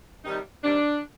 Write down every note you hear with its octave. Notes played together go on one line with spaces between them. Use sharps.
C3 D#3 G3 D#4
C3 D#3 G3 D4